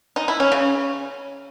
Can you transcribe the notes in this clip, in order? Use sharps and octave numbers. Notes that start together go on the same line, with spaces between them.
D#4
E4
C#4
C#3